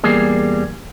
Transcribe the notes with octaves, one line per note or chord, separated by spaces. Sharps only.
E2 G3 A#3 G#4